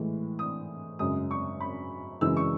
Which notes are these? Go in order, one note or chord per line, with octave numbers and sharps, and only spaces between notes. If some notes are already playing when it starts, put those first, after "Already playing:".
Already playing: A2 E3 G#3
D#6
F#2 C#3 G#3 D#6
C#6
B5
F#2 C#3 E3 G#3 E6
C#6